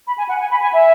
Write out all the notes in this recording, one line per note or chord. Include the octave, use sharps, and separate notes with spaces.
B5
G#5
F#5
G#5
B5
G#5
E5